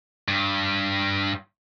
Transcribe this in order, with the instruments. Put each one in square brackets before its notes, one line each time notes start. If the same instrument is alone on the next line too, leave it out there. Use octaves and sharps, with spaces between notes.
[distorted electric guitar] G2